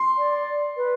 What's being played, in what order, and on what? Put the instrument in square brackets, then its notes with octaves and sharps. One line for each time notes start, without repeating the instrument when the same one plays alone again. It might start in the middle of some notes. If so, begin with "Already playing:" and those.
Already playing: [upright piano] C6
[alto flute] D5
B4